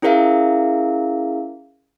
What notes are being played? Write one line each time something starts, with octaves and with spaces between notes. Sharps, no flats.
C#4 E4 G#4 A#4 E5 F5